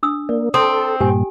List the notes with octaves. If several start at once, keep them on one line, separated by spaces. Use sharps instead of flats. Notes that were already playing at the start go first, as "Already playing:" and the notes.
D4 D#6 E6
A#3 D5
C4 A4 D#6
G2 A#2 G4 G#5